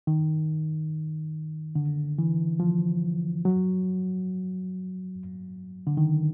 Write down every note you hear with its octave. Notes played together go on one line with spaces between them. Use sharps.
D#3
D3
E3
F3
F#3
D3
D#3